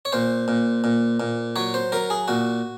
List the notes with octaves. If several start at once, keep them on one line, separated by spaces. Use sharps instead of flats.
C#5
A#2 C5
A#2
A#2
A#2
F#3 C#5
C5
F#3 A#4
G#4
A#2 F#4